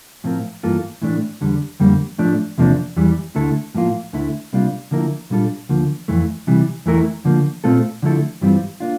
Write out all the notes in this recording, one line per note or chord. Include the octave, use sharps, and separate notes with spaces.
A2 F3 C4 F4 A#4
G2 E3 A#3 F4 A4
A2 E3 A3 D4
E2 D3 G3
F2 D3 G3 A#3
A2 F3 A3 D4
E2 C3 F3 A#3 D4
E2 E3 G3
D2 D3 A3 E4 A4
A2 F3 A#3 F4
D2 D3 A3 E4
C3 G3 A#3 D4 F4
D3 F3 A#3 E4 A#4
A#2 G3 D4 F4 A4
D2 D3 F3 A#3
F2 E3 A3
C3 E3 G3
E2 E3 A3 E4 A#4
D3 F3 A#3
A#2 A3 C4 F4 A4
D3 F3 A3 E4 A4
G2 E3 G3 C4 F4
A#3 D4 F4